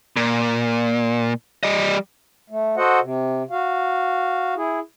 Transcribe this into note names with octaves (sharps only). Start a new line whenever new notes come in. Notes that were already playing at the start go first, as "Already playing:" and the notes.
A#2
G3 D#5
A3
F#4 A4 C5 D#5 F#5
C3
F#4 F5
E4 G#4